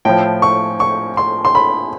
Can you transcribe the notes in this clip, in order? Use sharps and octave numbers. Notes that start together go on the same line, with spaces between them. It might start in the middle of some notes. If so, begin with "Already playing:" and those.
A2 F3 G5
C#6
C#6
C6
C6
B5